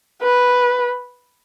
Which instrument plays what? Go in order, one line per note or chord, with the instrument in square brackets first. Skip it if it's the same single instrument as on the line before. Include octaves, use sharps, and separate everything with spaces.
[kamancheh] B4